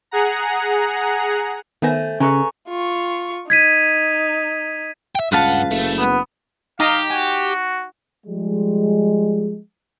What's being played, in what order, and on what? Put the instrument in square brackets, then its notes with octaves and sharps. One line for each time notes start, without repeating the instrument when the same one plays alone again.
[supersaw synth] G#4 F#5 A#5
[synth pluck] D#3 B3 A#6 [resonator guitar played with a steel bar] A3 C5 G#5
[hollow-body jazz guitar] C#3 [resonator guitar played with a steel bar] A4 B4 D#5 [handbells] G#5 A#5 C#6
[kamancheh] F4 C#6
[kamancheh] D#4 [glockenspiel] G#6 B6 D#7
[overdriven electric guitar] E5 G5
[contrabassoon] C#2 [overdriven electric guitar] G2 F#5 [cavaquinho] B4 F5 A5
[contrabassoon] F#1 [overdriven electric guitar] A3
[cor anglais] B3
[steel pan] D#4 A#5 D#6 [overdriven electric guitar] G4 [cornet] F5
[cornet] F#4 [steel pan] G#5
[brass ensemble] F3 G3 G#3